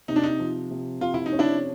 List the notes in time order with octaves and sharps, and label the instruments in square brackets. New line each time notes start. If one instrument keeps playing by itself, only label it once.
[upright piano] C3 [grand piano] D#4
[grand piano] D4
D#4
[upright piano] F3
C3
[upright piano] C3 [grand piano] F4
[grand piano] E4
D#4
[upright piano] C#4
[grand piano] D4 E4